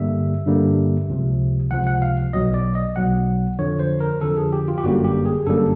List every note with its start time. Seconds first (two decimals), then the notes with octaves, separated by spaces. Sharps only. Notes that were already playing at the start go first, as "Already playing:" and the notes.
Already playing: G2 D3 G3 A#3 E5
0.46 G2 D3 G3 A#3
1.09 C#2 C3 F3
1.71 C#2 C3 F3 F#5
1.87 F#5
2.02 F5
2.33 B1 B2 F#3 D#5
2.54 D5
2.75 D#5
2.96 B1 B2 F#3 F#5
3.59 F2 D3 F3 C#5
3.79 C5
4.00 A#4
4.21 F2 D3 F3 A4
4.37 G#4
4.53 G4
4.68 F4
4.78 G4
4.84 G1 F#2 D3 G3 A#3 F#4
5.04 G4
5.26 G#4
5.46 G1 F#2 D3 G3 A#3 A4